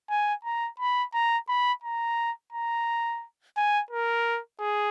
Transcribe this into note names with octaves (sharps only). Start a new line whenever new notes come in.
G#5
A#5
B5
A#5
B5
A#5
A#5
G#5
A#4
G#4